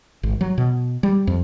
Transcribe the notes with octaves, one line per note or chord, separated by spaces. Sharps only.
G#1
F#3
B2
G3
F2